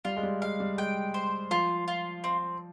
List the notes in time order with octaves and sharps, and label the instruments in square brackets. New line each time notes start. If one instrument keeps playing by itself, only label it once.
[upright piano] G3 [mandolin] F4
[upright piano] G#3
G3
[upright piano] G#3 [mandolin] F5
[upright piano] G3
[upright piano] G#3 [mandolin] G5
[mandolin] C5
[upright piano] F3 [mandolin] F4
[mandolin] F4
C4